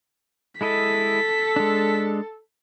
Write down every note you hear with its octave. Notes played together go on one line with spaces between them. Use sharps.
G#3 E4 A4 D#5 B6
G#3 D4